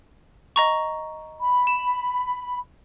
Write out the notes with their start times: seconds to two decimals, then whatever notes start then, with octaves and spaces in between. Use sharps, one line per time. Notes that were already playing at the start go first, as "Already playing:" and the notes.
0.56 D#5 A#5 C#6
1.40 B5
1.67 E7